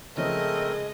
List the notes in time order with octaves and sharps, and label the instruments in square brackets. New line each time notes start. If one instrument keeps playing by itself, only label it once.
[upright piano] C#3 F3 C#4 [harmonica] G#3 [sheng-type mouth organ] A3 C4 A#4 [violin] D#5